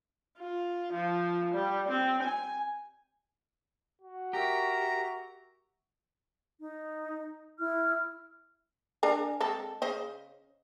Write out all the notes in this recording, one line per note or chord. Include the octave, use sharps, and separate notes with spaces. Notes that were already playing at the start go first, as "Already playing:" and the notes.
F4
F3
G3
C4
G#5
F#4
G4 A#4 E5 A#5 C#6
D#4
E4 F6
D4 A#4 G#5
G#3 C4 A4
C#3 C5 D#5